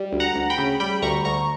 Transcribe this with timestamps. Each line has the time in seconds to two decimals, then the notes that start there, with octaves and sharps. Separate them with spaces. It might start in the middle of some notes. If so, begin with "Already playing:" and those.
Already playing: G3
0.12 D2
0.20 F#5 A#5
0.36 D2
0.50 G5 B5
0.58 C#3
0.80 G3 G5 B5
1.02 D2 A#5 C#6
1.25 D2 A#5 C#6